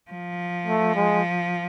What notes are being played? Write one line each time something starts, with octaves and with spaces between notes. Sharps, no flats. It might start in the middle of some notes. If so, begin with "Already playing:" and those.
F3
A3
G#3